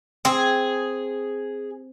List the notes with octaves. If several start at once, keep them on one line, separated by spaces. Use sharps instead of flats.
C4 G#4